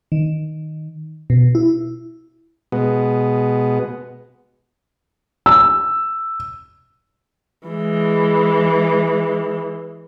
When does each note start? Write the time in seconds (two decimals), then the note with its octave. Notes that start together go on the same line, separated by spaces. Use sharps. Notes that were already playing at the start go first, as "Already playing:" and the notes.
0.12 D#3
1.30 B2
1.55 E4
2.72 B2 G#3 B3
5.46 E6
7.67 E3 G#3